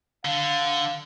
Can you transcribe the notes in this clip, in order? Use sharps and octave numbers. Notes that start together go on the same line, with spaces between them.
D3 F5